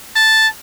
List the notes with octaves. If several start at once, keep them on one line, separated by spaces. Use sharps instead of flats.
A5